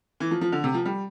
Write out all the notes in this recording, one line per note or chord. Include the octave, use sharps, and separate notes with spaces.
E3
F3
F3
D3
C3
F3
G3